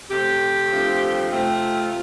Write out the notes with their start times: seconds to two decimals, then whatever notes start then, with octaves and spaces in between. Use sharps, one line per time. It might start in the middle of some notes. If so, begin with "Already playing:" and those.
0.10 C3 A3 C4 G4
0.71 G2 F3 A3 C4
1.31 C3 A3 C4 F4